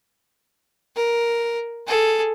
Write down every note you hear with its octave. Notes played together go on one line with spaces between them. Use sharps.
A#4
G#4 A4